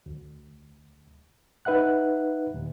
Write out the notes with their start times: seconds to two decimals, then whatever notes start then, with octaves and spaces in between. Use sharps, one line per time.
0.06 D2
1.65 D#4 B4 E5 F#5 F#6
2.54 D#2 A#2